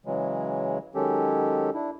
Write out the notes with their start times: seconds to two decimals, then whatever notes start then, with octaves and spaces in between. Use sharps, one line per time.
0.06 C#3 E3 F#3 G#3
0.95 D#3 F#3 G#3 C#4 G4 A4
1.74 D4 E4